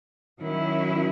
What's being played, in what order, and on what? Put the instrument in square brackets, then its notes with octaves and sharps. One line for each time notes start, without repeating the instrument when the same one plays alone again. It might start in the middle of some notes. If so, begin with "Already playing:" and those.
[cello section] D#3 F#3 C#4 E4